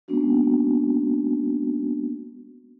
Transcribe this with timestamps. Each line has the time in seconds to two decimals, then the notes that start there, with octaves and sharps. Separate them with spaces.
0.08 G#3 A#3 B3 C#4 D4 F#4